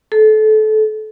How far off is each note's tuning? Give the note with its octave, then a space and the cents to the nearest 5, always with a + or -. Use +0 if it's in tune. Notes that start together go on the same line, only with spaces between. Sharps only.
A4 -25